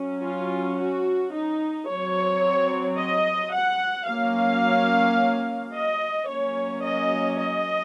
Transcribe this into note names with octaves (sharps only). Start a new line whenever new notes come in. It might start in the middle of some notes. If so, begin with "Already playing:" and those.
Already playing: F#3 C#4
F4
F#4
D#4
F#3 C4 C#5
D#5
F#5
F#3 A#3 C#4 F5
D#5
F#3 A#3 C#4 C#5
D#5
D#5